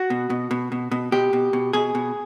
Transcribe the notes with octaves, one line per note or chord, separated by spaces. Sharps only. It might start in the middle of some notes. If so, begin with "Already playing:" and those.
Already playing: F#4
B2
B2
B2
B2
B2
B2 G4
B2
B2
B2 G#4
B2